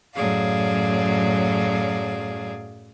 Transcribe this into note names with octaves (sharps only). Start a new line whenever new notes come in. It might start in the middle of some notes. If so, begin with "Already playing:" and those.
F#2 A2 F#3 G#4 D5 F5